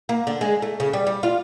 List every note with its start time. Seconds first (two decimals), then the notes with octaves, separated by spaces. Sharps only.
0.09 A#3
0.27 D3
0.41 G#3
0.62 A3
0.80 C#3
0.93 G3
1.07 G3
1.23 F4